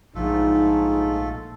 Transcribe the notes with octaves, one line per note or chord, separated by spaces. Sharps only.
A#1 G#2 A3 D#4 F4 A4